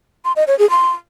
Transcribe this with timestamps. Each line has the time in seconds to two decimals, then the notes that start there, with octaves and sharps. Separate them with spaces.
0.25 C6
0.36 D#5
0.48 C#5
0.59 G#4
0.70 C6